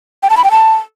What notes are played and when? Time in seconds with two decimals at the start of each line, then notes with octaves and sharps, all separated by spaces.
0.23 G5
0.30 A5
0.37 B5
0.44 G5
0.51 A5